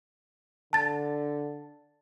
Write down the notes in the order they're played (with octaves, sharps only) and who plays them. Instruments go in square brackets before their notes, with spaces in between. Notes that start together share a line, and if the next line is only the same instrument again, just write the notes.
[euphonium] D3 [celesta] A5 A6